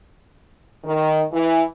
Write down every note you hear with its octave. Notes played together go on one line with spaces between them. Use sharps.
D#3
E3